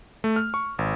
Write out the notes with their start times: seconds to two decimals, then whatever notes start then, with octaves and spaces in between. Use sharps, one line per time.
0.24 A3
0.36 F6
0.54 C#6
0.79 G#1